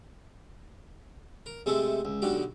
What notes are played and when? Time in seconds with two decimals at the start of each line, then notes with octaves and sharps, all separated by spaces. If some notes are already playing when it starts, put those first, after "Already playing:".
1.46 A#4
1.66 C3 G#3 A3 C4 A4
2.05 C#2
2.22 B1 D3 F#4 G4